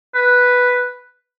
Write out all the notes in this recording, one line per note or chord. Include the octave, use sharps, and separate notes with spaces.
B4